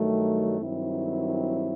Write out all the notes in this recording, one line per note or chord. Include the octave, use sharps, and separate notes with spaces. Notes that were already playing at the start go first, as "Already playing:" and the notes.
Already playing: G2 D#3 F#3 A3
G2 D#3 F#3 C4 E4